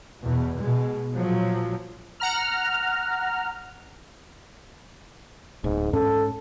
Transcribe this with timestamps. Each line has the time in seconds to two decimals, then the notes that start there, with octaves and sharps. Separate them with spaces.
0.22 E2 B2
0.60 B2 G#3
1.16 A#2 F3 F#3
2.20 F#5 A#5 F6
5.64 D1 G#2
5.93 G#2 C#4 A4